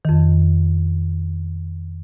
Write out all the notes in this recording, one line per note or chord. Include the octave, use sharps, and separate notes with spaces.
F2 D#3